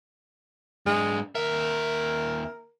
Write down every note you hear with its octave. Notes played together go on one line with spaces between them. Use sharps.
G#2 G#3 D4
D#2 A#4 E5